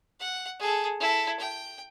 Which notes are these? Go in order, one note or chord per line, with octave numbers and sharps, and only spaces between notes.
F#5
G#4 A4
E4 A4
G5